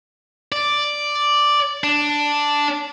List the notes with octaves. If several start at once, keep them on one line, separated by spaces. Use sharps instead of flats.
D5
D4